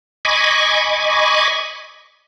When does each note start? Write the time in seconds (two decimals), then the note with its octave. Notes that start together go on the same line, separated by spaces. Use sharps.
0.25 D#5 G#5 B5 C#6 D6